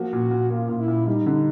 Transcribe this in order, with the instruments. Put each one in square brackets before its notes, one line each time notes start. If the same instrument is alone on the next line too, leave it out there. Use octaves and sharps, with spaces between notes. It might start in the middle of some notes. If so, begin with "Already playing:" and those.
Already playing: [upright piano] F3 A#3 [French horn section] F#4
[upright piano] A#2
A#2
[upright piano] A#3 [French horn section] F4
[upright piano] A#2
[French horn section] E4
[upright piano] A#2
[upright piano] G3 [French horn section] D#4
[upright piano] D3